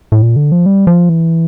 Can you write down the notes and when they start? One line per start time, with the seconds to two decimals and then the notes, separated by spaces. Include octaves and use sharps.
0.12 A2
0.22 A#2
0.36 D3
0.52 F3
0.66 G3
0.87 F3
1.09 E3